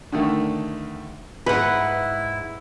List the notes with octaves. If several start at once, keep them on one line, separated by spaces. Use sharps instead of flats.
D3 D#3 A3
G#2 E4 B4 F#5 B5